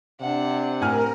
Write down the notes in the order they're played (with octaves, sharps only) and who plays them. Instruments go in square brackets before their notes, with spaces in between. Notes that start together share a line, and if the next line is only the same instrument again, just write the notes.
[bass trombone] C3 [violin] D4 F#5
[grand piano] A2 G#5 F6 [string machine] A#4